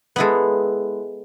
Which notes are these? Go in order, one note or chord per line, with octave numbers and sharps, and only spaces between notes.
G#3 B3 E4 A4